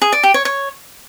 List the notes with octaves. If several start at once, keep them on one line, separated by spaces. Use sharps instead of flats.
G#4
D5
G4
C#5
C#5